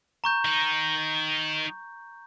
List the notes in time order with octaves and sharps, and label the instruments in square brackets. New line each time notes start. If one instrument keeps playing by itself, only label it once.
[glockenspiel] A#5 C#6 G6
[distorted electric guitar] D#3 D#4